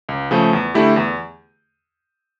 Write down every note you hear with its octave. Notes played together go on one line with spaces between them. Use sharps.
C#2
C#3 F3 A3
E2
D3 A3 E4 G4
E2